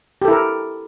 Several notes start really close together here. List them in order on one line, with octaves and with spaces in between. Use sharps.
G4 A4 E4 A#4